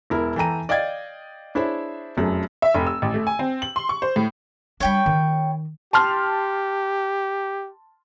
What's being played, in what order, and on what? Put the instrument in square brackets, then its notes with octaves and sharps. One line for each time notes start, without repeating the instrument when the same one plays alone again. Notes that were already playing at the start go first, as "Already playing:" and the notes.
[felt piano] E1 E4 A#4
E3 A4 G5 A#5 D#7
D5 D#5 F5 G5 G#6 A6
D4 E4 G#4 C5 C#5 E5
F1 F#2 G#4 A4
[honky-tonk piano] E5
F1
E6
A1
A3
G#5
C4
F#7
C6
C#6
C5
A2
[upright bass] G3 D4 [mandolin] C#5 G5 B5
[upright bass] D#3
[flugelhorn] G4 [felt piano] A5 C6 F6